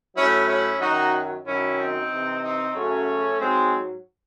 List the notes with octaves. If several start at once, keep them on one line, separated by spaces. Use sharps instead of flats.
A2 F#3 C#4 E4
C#4 E4
F#2 D#3 F#3 D#4 F#4
F#2 D#3 F#3 C#4 E4
C4 D#4
C3 E3
C4 D#4
F#2 C#3 F#3 A3 C#4
G#2 F#3 G#3 C4